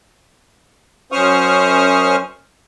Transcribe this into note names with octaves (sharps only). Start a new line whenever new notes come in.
F#2 C#4 C5 C#6 D#6 F6